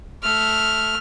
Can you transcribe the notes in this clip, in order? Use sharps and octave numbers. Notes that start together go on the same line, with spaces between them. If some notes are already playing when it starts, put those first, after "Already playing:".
A3 F6